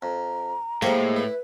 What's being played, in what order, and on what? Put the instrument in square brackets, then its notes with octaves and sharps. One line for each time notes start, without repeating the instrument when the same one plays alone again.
[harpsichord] F2 [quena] A#5
[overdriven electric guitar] A2 [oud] G#3 A#3 [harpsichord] G4 C5
[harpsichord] E4 [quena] B4